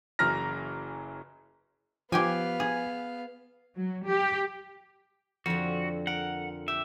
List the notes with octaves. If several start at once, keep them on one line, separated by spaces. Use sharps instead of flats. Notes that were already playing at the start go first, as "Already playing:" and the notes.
F#1 E3 F#3 A#5 F6 A#6
F3 B3 G4 F5 G5 G#5
G#4
F#3
G4
F2 D3 F3 F#4
A#4 F#5
G4 E5